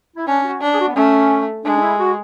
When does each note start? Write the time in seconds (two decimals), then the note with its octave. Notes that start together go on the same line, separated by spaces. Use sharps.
0.16 E4
0.27 C#4 D4
0.44 F#4
0.62 D4
0.74 G#4
0.79 F#4
0.88 B3
0.95 A3 C#4
1.64 G#3 D4
1.77 D4
1.81 E4
1.99 F#4